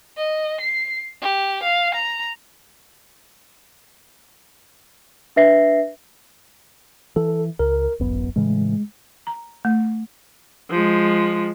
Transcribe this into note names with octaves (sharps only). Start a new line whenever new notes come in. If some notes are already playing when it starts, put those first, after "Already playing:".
D#5
C7
G4
F5
A#5
D4 B4 E5 A#6 C7
E3 A4
C#2 A#4
D1 G#1 F#2 B3
A2 C#3 E3 G#3
A#5
A3
F3 G#3